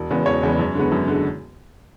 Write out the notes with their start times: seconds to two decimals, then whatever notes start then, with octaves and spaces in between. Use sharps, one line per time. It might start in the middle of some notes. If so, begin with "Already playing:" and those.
Already playing: E1
0.11 E2 C#3 G#3 B3
0.26 E1 C#5
0.43 E2 C#3 G#3 B3
0.59 F#2
0.75 D3 G#3 B3
0.92 F#2
1.08 D3 G#3